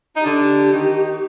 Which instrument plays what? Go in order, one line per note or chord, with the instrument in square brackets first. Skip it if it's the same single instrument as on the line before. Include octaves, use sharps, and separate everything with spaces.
[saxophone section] D#4
[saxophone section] D3 D4 [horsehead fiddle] G4
[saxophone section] D#3 D#4